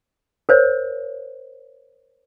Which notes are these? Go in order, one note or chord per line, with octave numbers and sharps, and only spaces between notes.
A#4 C5 C#5